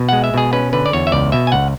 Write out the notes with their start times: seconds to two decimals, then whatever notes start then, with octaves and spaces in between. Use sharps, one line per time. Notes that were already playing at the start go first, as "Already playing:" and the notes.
Already playing: B2
0.09 G#3 F#5
0.24 E5
0.34 B2 G#4
0.53 C#4 B4
0.73 D3 B4
0.86 D5
0.93 E2 C#5
1.07 E5
1.12 C#2 D5
1.32 B2 E5
1.47 G#5
1.52 C#2 F#5